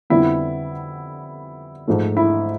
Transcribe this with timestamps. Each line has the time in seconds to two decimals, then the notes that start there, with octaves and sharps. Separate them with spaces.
0.10 F2 D3 G3 B3 E4
1.88 G#2 F3 A3
2.17 E4